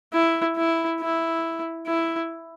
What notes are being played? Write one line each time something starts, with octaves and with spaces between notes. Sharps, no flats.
E4
E4
E4
E4